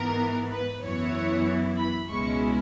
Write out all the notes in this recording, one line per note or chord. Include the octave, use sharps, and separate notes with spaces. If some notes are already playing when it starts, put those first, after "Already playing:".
Already playing: G#2 E3 B3 A#4
B4
F#2 E3 B3 E4 C#5
B5
C#2 B2 G#3 C#4 E4 C#6